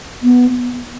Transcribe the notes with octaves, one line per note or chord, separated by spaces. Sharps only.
B3